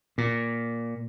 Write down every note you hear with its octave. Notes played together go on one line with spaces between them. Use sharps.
A#2